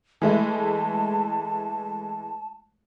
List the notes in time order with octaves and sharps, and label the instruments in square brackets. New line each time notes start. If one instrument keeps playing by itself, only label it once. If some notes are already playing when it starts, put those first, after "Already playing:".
[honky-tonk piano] E3 G#3 A3 [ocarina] A5